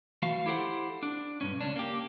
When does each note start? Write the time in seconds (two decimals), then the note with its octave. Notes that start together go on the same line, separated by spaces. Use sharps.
0.22 E3 A3 F#4 F5
0.46 E4 G4 A4 C5 F#5
1.03 D4
1.41 B1 G2 C#4
1.61 C#2 C#4 D4
1.76 A#3 G4